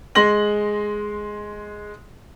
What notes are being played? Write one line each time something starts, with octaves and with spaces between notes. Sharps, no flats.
G#3 C6 A#6 F#7